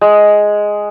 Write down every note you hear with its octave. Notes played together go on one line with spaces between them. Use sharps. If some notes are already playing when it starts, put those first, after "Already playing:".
G#3